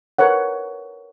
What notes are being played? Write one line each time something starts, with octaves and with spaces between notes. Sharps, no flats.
A#4 B4 C#5 F#5